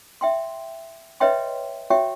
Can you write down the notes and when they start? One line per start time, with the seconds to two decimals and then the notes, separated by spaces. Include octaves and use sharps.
0.21 E5 G5 C6
1.20 B4 C#5 D#5 E5 G5 C6
1.90 F#4 C#5 E5 G5 C#6